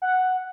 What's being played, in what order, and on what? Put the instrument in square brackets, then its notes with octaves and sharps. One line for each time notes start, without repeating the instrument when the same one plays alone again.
[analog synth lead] F#5